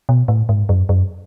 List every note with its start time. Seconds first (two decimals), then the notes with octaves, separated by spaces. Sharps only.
0.09 B2
0.28 A2
0.49 G#2
0.69 F#2
0.89 F#2